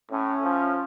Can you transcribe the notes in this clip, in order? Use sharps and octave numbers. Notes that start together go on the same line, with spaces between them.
A2 C#4
F3